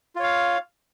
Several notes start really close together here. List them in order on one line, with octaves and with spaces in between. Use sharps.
F4 C#5 F5